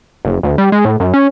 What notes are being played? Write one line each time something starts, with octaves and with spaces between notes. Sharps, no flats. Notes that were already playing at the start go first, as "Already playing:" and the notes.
F#1
D2
G3
G#3
A2
F#2
C#4